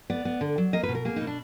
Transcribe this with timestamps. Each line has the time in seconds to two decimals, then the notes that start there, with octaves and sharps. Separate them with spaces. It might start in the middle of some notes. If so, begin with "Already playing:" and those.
0.10 B3 D5
0.25 B3
0.41 D3
0.58 F#3
0.73 A#3 D#5
0.83 B4
0.89 B2
0.95 A#4
1.05 A#3 G#4
1.16 B2 D#4
1.27 D4